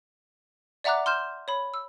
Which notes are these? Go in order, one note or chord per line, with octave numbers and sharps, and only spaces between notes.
D5 E5 F#5 A#5 D6 F#6
C6 F6 G6 E7
C#5 B5
E6